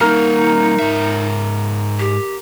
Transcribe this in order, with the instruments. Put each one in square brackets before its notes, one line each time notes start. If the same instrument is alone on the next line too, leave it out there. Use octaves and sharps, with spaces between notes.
[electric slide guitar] G3 A#3 F5 [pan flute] D#4 [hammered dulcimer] A#4
[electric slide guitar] G#2 E5
[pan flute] G4